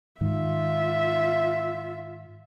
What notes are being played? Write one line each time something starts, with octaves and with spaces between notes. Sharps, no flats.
G#2 D#3 F4 E5